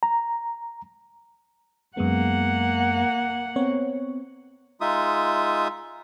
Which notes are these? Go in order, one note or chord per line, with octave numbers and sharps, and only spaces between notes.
A#5
F#2 G#3 A#3 B3 F#5
B3 C4 C#5
G#3 D#4 F4 E5 D#6